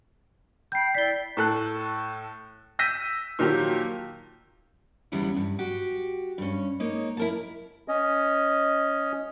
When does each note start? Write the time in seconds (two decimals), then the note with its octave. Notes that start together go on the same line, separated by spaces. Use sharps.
0.72 G5 B5 G6 C7
0.95 E4 D5 B6 G7
1.37 A2 A4 F#6
2.79 E6 G6 A#6 B6 D#7
3.39 A#2 D#3 F3 F#3 G4
5.12 E2 C#3 G3 B3 E4
5.36 G2
5.59 F#4 G4
6.38 G2 C#4
6.80 G#3 A#3 D#4 C#5
7.17 E4 A#4 A5
7.88 C#4 D#5